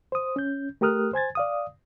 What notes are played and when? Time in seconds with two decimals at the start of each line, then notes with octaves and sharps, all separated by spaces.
0.12 C5 D#6
0.36 C#4 G6
0.81 A3 G4 A#4 D#6 F6 F#6
1.13 C5 G#5 G#6 A6
1.35 D5 F5 D#6